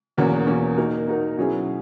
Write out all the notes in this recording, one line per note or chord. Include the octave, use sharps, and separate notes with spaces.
E2 B2 A#3 C#4
E2 B2 A#3 C#4
A#3 D#4 F#4 A#4
A#3 D#4 F#4 A#4
B2 F#3 C#4 E4 G#4